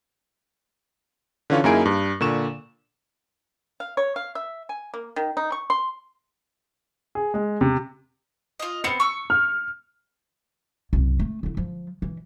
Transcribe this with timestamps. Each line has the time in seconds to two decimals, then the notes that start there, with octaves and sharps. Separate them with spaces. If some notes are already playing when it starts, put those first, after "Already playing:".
1.50 D3 E3 C#4 F4 C#5
1.64 F#2 A#3 D#4 E4 G#4 D7
1.85 G2
2.21 A#2 D3 C#6 E7
3.80 F5
3.97 C#5
4.16 F5
4.35 E5
4.69 G#5
4.94 A#3
5.16 D#3
5.37 D#4
5.52 C#6
5.70 C6
7.15 G#4
7.34 G#3
7.61 C3
8.60 F4 D#5
8.84 B3 C4 C#7
9.00 C#6 E6
9.30 F6
10.93 C2 F#2
11.19 A3
11.43 D3 E4
11.57 F3
12.02 E3